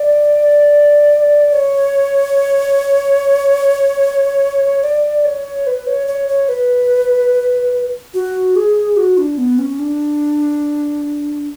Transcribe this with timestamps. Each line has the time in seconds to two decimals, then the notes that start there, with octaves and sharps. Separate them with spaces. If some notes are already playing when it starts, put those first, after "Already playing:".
Already playing: D5
1.53 C#5
4.83 D5
5.25 C#5
5.67 B4
5.87 C#5
6.07 C#5
6.28 C#5
6.49 B4
8.14 F#4
8.56 G#4
8.97 F#4
9.18 D4
9.38 B3
9.58 C#4
9.79 D4